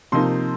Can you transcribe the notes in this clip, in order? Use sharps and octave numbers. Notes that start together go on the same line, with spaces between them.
C3 F3 A#3 D#4 C6